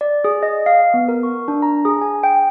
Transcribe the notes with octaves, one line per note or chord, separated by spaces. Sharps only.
D5
G#4
D#5
F5
B3
A#4
C#6
D4
A#5
G#4
G#5
G5